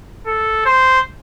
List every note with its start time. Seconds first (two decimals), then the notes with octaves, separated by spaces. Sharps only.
0.26 A4
0.65 C5